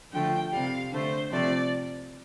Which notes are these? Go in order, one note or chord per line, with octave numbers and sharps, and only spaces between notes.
D3 F3 A3 G5
C3 G3 F5
D3 A3 C5
C3 F3 A3 D5